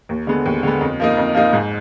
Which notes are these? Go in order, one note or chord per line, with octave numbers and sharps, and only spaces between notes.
D#2
D3 G#3 B3
D#2
D3 G#3 B3
F2
F3 A#3 D#4
F2
F3 A#3 D#4
G#2